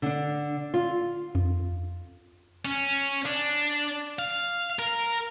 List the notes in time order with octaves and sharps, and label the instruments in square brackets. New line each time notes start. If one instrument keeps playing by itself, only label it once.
[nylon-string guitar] D3 D4
F4
[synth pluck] F2
[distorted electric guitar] C#4
D4
F5
A#4